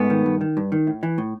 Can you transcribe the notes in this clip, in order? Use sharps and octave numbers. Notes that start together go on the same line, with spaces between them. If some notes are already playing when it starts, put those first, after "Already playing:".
Already playing: G#2 A3 B3
D#3
G2
D#3
G2
D#3
A2
E3
A2